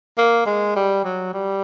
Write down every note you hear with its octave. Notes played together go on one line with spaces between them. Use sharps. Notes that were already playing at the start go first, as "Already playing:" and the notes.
A#3
G#3
G3
F#3
G3